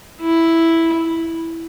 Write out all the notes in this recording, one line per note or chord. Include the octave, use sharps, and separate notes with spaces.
E4